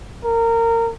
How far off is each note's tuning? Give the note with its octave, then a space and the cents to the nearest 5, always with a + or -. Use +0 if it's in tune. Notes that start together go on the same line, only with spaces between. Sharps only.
A#4 -20